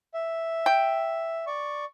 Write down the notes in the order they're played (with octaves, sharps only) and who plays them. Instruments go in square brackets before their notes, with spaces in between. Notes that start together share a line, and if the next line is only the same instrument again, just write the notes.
[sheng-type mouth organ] E5
[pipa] G5
[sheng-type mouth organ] D5 C#6